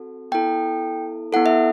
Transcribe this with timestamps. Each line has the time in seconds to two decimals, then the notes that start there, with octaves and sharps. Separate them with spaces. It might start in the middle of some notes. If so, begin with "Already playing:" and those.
Already playing: C4 F#4 A4
0.32 B3 E4 A4 G5
1.33 B3 E4 A4 F#5
1.46 E5